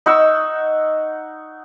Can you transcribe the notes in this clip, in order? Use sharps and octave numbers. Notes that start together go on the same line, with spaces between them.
D#4 F#5 C#6 E6